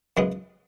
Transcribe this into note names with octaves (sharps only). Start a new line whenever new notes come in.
F#2 C#3 G#3 B3